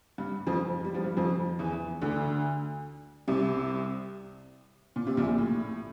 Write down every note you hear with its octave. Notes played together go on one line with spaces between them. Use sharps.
G2 G3
F2 F3
G3
F3
G2 G3
F2 F3
E2 E3
D2 D3
C2 C3
A#2
C3
A#1 A#2
A2